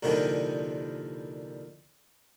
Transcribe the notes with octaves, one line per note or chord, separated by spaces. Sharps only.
C2 A#2 D3 D#3 F3 G3